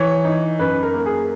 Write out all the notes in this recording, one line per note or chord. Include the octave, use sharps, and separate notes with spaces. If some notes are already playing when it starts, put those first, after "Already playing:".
Already playing: E3 C#5
D#4
F#2 B4
A#4
A#3
G#4